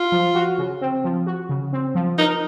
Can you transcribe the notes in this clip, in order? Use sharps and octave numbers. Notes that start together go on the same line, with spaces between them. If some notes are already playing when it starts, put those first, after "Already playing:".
Already playing: F4
F3
F#4
C#3
C4
F3
F#4
C#3
C4
F3
D#4 A#4